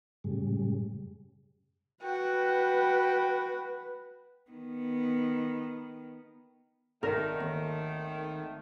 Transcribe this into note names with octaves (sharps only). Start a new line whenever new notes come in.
F#2 A2 C#3 G3 G#3
F#4 B4 G5
D#3 B3
G#1 D#3 A3 A#4 D5 A#6
D#2